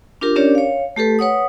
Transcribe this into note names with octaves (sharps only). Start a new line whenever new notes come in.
D4 F4 G4 A#4
C#4 D4 G4 A#4 C#5 D5
C#5 F5
A3 G4 A4 B4
B4 C#5 F#5 D#6